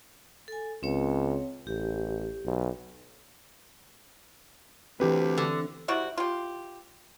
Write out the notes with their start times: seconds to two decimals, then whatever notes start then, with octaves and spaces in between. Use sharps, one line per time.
0.48 A4 G#5
0.83 C#2 C4 C#5
1.67 A1 G4
2.45 B1
5.00 D2 E3 C4 G4 B4
5.38 D3
5.88 C3 G3 E4 F#4
6.17 F4 G4